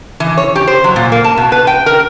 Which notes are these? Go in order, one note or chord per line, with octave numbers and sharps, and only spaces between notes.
E3
C#5
G4
C5
F#3
A#2
A#3
A5
B2
B4
G5
A#4